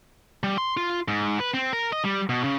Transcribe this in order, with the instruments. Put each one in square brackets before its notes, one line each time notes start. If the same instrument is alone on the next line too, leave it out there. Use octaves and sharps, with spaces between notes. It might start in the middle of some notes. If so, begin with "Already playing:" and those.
[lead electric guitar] G3
C6
F4
G#2
B4
C4
A#4
D#5
G3
B2
C#3